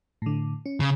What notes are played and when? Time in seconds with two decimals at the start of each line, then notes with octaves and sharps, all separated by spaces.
0.22 A2 D3
0.66 C#4
0.80 C#3